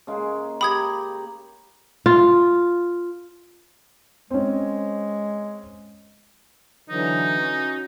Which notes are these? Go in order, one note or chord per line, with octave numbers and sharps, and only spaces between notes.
C#3 G#3 A#3
G4 A#5 B5 D#6 G#6
F4
G#3 C4 C#4
D3 E3 F#3 D#4
C#4 F#4